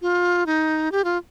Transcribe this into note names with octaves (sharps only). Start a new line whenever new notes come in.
F4
D#4
G4
F4